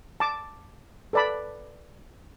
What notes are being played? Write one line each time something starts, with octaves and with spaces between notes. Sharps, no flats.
A5 D6
A4 B4 D5 A5 B5